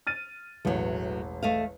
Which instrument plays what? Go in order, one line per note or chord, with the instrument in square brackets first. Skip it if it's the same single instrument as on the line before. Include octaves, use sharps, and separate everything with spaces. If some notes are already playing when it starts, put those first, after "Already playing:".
[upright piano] F6 A6 D#7
[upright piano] E1 A1 [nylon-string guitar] A2 F#3
[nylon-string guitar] A3 D#5 F5